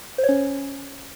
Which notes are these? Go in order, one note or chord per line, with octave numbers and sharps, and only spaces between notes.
C5
C#5
C#4